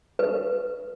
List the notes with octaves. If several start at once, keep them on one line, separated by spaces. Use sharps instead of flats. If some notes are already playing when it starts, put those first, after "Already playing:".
B4